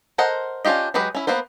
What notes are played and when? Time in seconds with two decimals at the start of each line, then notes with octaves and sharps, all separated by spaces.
0.18 A4 A#4 C5 D#5 F#5
0.65 C#4 D4 F4 G4 D#5
0.94 F#3 G#3 G4 G#4 B4
1.15 C#4 E4
1.27 A#3 B3 B4 C5